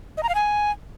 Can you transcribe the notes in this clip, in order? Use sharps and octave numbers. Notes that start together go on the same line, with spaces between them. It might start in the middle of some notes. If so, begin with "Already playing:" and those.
D#5
A#5
F5
G#5